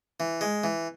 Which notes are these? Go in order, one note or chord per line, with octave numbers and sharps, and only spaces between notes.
E3
G#3
E3